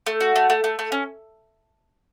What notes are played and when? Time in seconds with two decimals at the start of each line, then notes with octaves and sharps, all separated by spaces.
0.06 A3
0.21 F#4
0.36 A3
0.50 A3
0.64 A3
0.79 A3
0.92 C#4